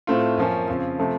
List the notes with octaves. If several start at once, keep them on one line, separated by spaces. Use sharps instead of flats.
A2 A3 C4 F4
F#2 F3 A#3 C#4
F2 C#3 F3
C3 F3 A3